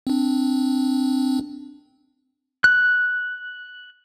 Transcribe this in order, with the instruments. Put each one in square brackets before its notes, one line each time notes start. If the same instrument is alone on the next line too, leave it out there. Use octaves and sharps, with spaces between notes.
[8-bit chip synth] C4 D4
[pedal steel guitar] F#6